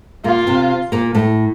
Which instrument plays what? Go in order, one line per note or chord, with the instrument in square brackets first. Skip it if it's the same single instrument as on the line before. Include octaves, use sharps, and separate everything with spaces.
[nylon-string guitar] A#2 A#3 [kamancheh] F4
[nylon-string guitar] C3 C4
A#2 A#3
A2 A3